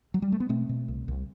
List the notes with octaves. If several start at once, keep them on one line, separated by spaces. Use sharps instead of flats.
F#3
G3
A3
B3
B2 A3 C4
B2
C2
C2